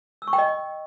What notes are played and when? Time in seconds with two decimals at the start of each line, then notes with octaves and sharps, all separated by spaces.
0.22 E6
0.27 C#6
0.33 G5
0.38 D#5